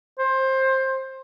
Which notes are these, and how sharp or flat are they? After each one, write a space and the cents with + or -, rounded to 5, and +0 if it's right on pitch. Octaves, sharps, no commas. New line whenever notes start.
C5 +20